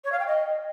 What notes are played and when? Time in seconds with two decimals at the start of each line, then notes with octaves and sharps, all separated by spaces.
0.05 C#5
0.12 F5
0.20 G5
0.27 D#5